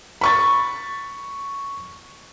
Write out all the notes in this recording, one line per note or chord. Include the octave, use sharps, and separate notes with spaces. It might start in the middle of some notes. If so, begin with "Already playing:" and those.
B5 C#6 A6